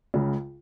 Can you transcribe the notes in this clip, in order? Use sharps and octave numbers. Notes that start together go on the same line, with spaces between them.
C#2 C#3